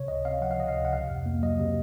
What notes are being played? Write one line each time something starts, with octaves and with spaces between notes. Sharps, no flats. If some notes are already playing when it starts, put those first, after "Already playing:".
Already playing: C3 C#5
C#2 D#5
C4 F5
F3 F#5
F5
C3 D#5
F5
C#2
F#5
C3 F5
F2
A#3
F#3 D#5
C3